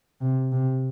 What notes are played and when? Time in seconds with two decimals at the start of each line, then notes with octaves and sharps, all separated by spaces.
0.21 C3
0.52 C3